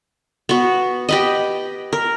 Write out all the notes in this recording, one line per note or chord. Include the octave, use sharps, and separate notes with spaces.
B3 F#4
G4 B4 D#5
A#4